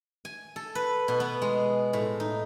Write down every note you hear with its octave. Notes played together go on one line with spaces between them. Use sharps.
G#5
A4
B4
B2
B3
G#3
A2
D#4